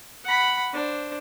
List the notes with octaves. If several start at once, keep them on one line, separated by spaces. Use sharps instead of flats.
F#5 B5
D4 C5